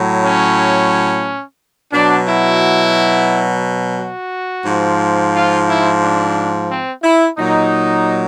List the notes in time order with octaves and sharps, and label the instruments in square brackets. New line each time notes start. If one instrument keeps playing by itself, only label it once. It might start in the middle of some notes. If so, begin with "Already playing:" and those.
Already playing: [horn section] A2 F#3
C#4
B2 F#3 D4
E4
F#4
G#2 F3
F4
E4
D4
C4
E4
A#2 F#3 D#4